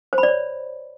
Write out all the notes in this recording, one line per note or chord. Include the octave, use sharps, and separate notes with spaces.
C5
B5
D5
C#5